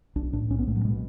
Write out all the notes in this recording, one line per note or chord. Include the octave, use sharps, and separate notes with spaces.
B1 D4
A2 D4
B1 C#4
B3
A2 A3
F#3
B2 G#3